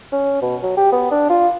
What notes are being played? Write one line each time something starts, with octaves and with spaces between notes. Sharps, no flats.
C#4
B2
F#3
G4
B3
D4
F4